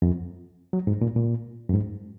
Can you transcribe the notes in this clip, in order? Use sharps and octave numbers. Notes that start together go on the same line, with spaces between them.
F2
F#3
G#2
A#2
A#2
F#2
G#2